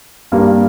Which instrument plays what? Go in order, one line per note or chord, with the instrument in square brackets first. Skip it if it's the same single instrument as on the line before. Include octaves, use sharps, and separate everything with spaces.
[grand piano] G2 G3 A#3